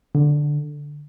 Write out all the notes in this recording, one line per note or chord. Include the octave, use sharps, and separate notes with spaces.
D3